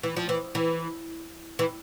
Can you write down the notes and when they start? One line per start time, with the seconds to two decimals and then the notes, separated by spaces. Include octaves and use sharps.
0.03 E3
0.16 F3
0.29 E3
0.55 E3
1.59 E3